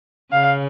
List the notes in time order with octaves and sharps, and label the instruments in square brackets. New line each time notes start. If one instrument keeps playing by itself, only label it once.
[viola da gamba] C#3 [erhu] F5